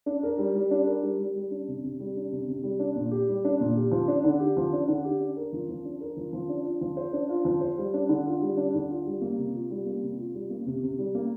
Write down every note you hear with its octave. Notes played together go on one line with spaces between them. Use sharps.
D4
A#4
G3
G3
D4
A#4
G3
G3
G3
D4
C3
C3
G3
D4
C3
C3
G3
D4
A#2
G4
G3
D4
A#2
G4
F3
D4
D3
G4
F3
D4
D3
G4
D4
A#4
F3
F3
D4
A#4
F3
F3
D4
F4
F3
C5
D4
F4
F3
C5
G3
D4
D3
F4
G3
D4
D3
F4
G3
A#3
C3
F4
G3
A#3
C3
F4
G3
A#3
C3
C3
G3
A#3